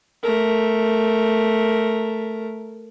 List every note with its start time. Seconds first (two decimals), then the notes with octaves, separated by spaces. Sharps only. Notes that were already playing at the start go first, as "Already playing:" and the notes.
0.23 A3 A#4